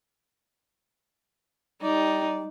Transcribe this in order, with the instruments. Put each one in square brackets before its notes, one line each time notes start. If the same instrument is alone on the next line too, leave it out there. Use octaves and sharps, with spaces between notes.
[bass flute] G3 [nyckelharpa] D#4 [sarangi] D5